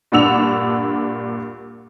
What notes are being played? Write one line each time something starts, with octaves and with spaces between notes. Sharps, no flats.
G2 A#2 D4 F#5 E6 F7